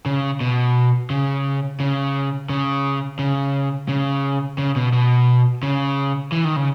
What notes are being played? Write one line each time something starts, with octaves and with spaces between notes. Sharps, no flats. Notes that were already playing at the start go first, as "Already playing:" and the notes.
C#3
B2
C#3
C#3
C#3
C#3
C#3
C#3
B2
B2
C#3
E3
D#3
C#3